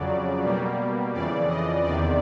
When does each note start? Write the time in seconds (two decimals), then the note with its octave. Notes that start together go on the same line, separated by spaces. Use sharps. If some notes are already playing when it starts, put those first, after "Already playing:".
Already playing: F2 C#3 F#3 D5
0.41 B2 G3 A#3
1.13 F2 C#3 E3 D5
1.49 D#5
1.84 E2 C3 D#3 D5